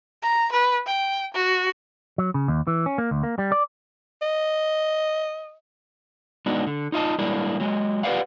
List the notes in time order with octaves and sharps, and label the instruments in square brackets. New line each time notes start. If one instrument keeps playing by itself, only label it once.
[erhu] A#5
B4
G5
F#4
[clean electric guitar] F#3
C#3
D#2
E3
C#4
A#3
D2
A#3
G3
D5
[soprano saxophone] D#5
[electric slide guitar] G#3 B3 D4 D#4 F#4
D3
D#4 F4 D#5 A5
G3 G#3 A#3 D4 E4
F#3 G#3 D#5
F4 G4 B4 D5 F5 F#5